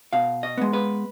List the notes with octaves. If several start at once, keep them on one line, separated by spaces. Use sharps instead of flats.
B2 F5
D#5
G#3 B3
B4